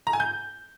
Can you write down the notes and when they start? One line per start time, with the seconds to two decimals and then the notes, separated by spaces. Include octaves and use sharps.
0.07 A#5
0.13 G#5
0.20 G6